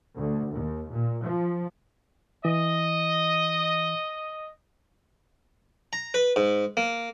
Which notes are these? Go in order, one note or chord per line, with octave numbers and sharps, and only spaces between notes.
D2
D#2
A#2
F3
E3 D#5
A#5
B4
G#2
A#3